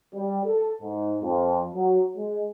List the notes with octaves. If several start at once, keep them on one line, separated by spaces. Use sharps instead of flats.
G3
A4
G#2
F2
F#3
G#3